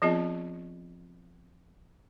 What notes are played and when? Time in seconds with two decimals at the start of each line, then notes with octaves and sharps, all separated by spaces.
0.02 F3 B3 C4 F4 G#4 D#5